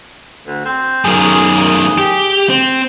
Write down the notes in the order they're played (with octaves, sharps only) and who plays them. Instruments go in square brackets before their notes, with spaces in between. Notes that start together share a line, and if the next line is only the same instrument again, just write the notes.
[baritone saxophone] D2
C4
[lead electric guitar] F#2 D#3 [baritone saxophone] G#4
[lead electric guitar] G4
C4